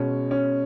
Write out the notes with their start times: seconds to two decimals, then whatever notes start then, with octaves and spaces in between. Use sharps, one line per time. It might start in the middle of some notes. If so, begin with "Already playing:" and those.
Already playing: B2 G#3 C#4
0.31 C#4